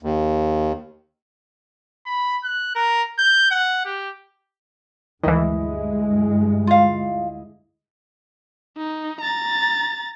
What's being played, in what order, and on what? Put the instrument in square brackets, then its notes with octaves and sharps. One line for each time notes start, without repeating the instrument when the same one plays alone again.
[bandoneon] D#2
[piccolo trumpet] B5
F#6
A#4
G6
F#5
G4
[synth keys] D2 E4 D#5 [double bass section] G2 G#3 [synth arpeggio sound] D#3 E3
[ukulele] F4 F5
[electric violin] D#4
A#5 A6